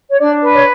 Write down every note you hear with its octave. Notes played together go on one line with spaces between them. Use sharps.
C#5
D4 D5
B4
C#5